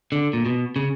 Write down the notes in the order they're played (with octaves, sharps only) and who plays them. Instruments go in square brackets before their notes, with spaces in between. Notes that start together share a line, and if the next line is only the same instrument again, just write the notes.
[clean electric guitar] D3
A#2
B2
C#3